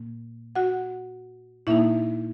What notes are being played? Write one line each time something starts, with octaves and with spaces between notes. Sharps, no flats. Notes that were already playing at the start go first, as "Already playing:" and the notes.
Already playing: A#2 A#3
F#4 F#5
A#2 A#3 D#4 E4 E5